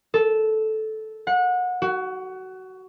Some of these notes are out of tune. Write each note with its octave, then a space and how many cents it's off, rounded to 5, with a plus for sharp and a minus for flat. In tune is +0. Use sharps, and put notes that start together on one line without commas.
A4 -10
F#5 -30
F#4 +20